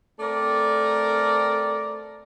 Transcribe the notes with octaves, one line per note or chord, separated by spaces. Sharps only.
A3 C4 A#4 D5